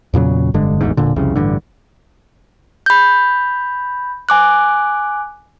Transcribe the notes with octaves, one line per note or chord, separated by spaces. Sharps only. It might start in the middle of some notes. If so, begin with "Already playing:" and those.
E2 A#2 C#3 F#3
F1 G2 D3 G#3
D1 A1 E2 G#2
E1 A#2 D3
C2 F2 C#3
A1 G2 D3
B5 G6
G#5 D6 F#6